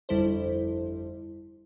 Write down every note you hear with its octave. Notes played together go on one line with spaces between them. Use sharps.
G1 F2 G3 E4 A4 C5